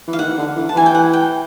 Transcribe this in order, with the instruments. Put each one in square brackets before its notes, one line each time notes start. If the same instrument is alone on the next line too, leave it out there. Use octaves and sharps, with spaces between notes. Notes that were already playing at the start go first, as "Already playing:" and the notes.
[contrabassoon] E3
[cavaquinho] F5
[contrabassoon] D#3 [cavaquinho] F#5
[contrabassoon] D3
E3
[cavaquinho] A5
[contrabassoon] E3 [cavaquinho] G#5
[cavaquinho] G5
F#5
G5